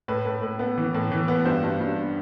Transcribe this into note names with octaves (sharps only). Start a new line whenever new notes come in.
A2 B4
A2
A2
B3
E3
A2
E3
B3
G2 C5
G2
G2